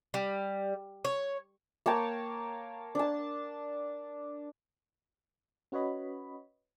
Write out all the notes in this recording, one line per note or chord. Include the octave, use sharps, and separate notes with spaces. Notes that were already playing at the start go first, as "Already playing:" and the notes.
G3
C#5
A#3 C#5 G5 A5
D4 A5
C#4 F#4 B4 C#5 D#5 B5